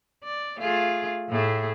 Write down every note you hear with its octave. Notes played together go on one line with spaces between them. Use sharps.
D5
A3 F4 G#4
A2 A3 G#4